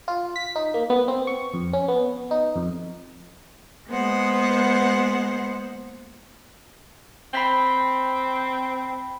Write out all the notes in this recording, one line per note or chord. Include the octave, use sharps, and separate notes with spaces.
F4
B6
D#4
A#3
B3
C4
C#6
F2
C#4
B3
D#4
F2
G#3 A#3 B3 C5 F#5
C4 B5 B6 G7